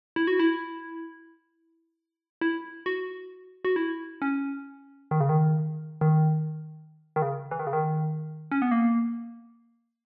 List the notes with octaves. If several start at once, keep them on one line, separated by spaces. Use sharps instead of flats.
E4
F#4
E4
E4
F#4
F#4
E4
C#4
D#3
C#3
D#3
D#3
D#3
C#3
E3
D#3
C#3
D#3
C#4
B3
A#3